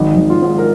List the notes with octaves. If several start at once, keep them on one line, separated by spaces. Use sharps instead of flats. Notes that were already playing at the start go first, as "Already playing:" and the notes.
Already playing: G#1 D#4
G#1
F4
G#2
A#4